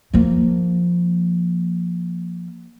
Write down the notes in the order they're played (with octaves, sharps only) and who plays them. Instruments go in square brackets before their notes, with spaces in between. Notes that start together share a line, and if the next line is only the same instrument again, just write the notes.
[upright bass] F3 A#3